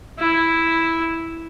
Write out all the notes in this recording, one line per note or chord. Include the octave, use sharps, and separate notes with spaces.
E4